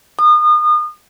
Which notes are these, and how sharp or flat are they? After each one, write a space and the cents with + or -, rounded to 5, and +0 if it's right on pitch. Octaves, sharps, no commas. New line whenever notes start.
D#6 -35